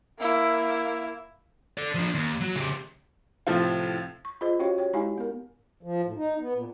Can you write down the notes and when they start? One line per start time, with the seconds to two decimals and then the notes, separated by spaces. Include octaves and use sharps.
0.19 A#3 E4
1.78 A4 D5
1.95 F3 D4
2.15 D#2
2.40 F#3 F#4
2.56 C#3 G4
3.47 A2 C3 F3 C4 F4
4.25 C#6
4.41 F4 G#4 C5 D#5
4.59 C#4 F#4 G4 C#5 F5 G5
4.77 G4 C#5 G5
4.93 G#3 D#4 E4 G4 F5 G#5
5.18 B3 A#4
5.83 F3
6.05 A2
6.16 D#4
6.40 B3
6.54 A#2